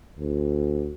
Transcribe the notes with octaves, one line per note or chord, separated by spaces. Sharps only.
D2